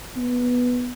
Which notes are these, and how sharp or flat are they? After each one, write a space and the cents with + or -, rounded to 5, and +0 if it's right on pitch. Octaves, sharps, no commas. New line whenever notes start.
B3 -5